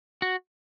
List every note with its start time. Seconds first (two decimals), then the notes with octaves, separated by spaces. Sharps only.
0.22 F#4